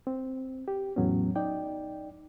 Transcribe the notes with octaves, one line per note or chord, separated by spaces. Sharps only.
C4
G4
E2 A2 F#3 B3 C#4
D#4 D5 G5